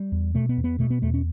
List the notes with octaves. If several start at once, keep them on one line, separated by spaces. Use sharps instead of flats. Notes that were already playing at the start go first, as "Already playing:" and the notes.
Already playing: G3
E2
B2 A3
B3
E2
B3
B2 A3
B3
E2 A3
C#4